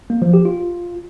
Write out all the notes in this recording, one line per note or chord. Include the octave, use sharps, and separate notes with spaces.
A#3
F3
G4
F4